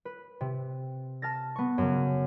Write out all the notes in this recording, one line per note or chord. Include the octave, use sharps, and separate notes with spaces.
B4
C3
A5 F6 A6 A#6
B3 C#6
F#2 C#3